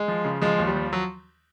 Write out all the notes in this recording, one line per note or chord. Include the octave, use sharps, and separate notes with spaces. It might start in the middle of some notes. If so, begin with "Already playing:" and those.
Already playing: G#3
F3
C#3
F3 G#3
D#2
G3
F3
F#3